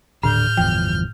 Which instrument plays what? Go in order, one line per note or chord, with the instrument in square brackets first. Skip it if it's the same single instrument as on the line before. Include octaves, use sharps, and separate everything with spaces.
[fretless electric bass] D#1 D3 [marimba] A2 [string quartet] F6 G6
[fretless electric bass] G1 E2 F3 [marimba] G5